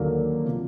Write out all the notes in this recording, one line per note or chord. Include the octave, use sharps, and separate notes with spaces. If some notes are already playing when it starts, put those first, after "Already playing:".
Already playing: D#2 D3 F#3 A#3
C3 F3